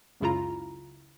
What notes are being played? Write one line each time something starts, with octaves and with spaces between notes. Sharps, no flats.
C#2 F#2 C#3 E4 F4 A#5